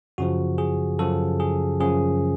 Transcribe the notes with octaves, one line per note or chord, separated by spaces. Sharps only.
F#2 C#3 F3 F#4
G#4
F#2 C#3 F3 A4
G#4
F#2 C#3 F3 G#4